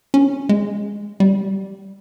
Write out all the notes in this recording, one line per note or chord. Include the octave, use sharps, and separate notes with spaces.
C#4
G#3
G3